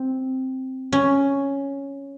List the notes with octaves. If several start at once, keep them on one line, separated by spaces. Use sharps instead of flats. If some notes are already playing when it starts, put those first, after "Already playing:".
Already playing: C4
C#4